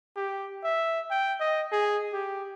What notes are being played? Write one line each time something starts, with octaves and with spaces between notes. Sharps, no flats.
G4
E5
G5
D#5
G#4
G4